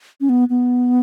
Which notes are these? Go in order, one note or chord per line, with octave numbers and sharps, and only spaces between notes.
C#4
B3
B3